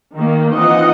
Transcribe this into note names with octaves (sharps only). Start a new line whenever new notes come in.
D#3 A#3
E3 C4 D#4 F4 D#5 F#5